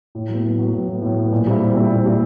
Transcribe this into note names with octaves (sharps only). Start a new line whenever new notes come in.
A2
F#3 B3
A2
F#3 B3
A2
F#3 B3
A2
F#3 B3
A#2
G3 C4 E4
A#2
G3 C4 E4
A#2
G3 C4 E4